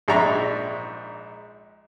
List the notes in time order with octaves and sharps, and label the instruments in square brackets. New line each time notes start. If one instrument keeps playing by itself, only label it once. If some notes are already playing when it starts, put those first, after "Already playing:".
[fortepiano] A#1 G#2 D4 E5 A#5 C#6